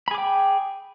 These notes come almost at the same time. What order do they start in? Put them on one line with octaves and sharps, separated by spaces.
B5 G#4 D6 G5